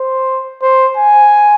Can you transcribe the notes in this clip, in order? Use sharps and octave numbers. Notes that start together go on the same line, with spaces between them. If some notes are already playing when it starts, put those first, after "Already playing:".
Already playing: C5
C5
G#5